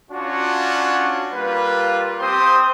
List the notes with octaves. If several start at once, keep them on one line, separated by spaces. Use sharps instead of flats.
C#4 D4 F4 F#4
G3 A#3 F4 B4
C4 G4 C5 C6 D#6